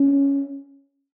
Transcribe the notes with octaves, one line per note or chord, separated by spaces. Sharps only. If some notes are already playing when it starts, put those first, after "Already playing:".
Already playing: C#4